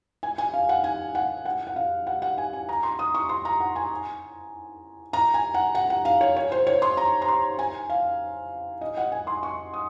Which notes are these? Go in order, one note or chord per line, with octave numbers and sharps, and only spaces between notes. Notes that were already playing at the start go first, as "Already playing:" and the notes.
G#5
G#5
F5
F#5
G#5
F#5
F#5
F#5
F5
F#5
F#5
G#5
G#5
A#5
C6
D#6
C#6
C6
A#5
F#5
G#5
A#5
G#5
F#5
F#5
F#5
F5
C#5
C#5
C5
C#5
C6
A#5
A#5
C6
G#5
F5
D#5
F#5
G#5
C6
C#6
D#6